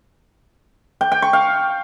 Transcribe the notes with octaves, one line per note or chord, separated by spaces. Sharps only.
G5
G5
C#6
F5